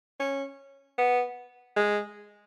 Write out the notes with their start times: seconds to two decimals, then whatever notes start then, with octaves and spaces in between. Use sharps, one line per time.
0.20 C#4
0.98 B3
1.76 G#3